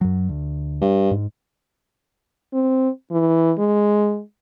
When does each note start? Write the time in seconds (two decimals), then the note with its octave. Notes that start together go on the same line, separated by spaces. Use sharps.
0.01 F#2 F#3
0.29 D2
0.81 G2
1.11 G#2
2.54 C4
3.11 E3
3.59 G#3